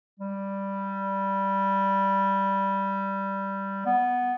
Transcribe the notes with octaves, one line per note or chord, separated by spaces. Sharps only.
G3
B3